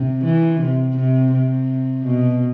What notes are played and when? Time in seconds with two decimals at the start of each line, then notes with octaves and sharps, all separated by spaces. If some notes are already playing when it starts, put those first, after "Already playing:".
Already playing: C3
0.24 E3
0.60 C3
0.96 C3
1.32 C3
2.05 B2